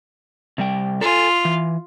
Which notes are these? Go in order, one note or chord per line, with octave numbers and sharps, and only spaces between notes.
C3 G3 G5
F4 A4 G#5
E3